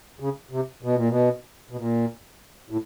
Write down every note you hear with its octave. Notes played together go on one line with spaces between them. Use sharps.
C#3
C3
B2
A#2
B2
B2
A#2
A2